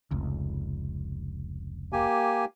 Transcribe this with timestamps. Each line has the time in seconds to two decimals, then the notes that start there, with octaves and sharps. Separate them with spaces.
0.11 F1 C#2
1.93 A#3 G4 G#5